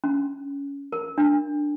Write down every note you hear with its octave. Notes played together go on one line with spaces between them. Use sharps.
C#4
A#4
D4